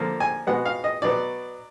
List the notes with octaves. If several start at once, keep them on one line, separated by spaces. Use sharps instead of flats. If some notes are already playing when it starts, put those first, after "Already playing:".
Already playing: D3 F3 A#3
G#5
B2 G#3 B3 F#5
F5
D#5
B2 F#3 B3 D5